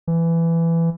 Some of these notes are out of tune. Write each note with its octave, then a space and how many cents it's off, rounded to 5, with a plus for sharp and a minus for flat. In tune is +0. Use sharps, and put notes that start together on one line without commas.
E3 +15